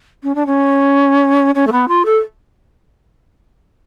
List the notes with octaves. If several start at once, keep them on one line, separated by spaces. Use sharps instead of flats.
C#4
D4
C#4
C#4
A3
B3
F4
A4